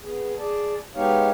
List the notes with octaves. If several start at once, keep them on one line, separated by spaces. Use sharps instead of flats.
B3 G#4
G#4 D5 A5
G#3 B3 D#4 G4 C#5 F5